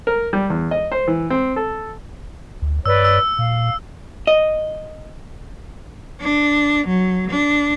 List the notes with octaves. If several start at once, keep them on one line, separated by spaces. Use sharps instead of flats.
A#4
G3
E2
D#5
C5
E3
C4
A4
D2
G2 B4 C#5 D5 E6
E6
A#2 F5
D#5
D4
F#3
D4